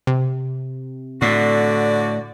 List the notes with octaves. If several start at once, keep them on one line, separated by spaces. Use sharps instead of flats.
C3
A2 D3 F#4 D5